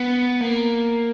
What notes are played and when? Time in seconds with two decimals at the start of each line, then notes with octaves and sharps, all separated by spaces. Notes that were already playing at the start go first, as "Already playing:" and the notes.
Already playing: B3
0.41 A#3